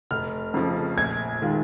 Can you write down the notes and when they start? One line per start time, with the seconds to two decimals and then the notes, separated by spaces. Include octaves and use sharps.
0.11 F1 F6
0.54 F2 C#3 F3
0.97 A#1 G#6
1.42 D#3 G#3 F4